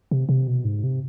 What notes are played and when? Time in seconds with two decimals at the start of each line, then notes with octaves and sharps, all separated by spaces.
0.11 C3
0.29 C3
0.47 B2
0.65 G#2
0.83 C3